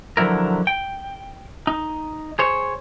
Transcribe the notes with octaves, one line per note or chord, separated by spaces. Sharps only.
D3 F3 F#3 E4 A#4
G5
D#4
G#4 C5 C#5